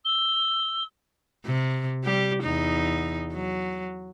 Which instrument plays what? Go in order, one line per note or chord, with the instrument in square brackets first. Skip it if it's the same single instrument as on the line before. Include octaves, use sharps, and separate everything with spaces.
[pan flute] E6 [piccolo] G7
[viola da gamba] C3
G3 G4
E2 D#4
F#3